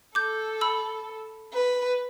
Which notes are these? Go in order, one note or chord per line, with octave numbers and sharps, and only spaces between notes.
A4 D6 G6
B5 E6
B4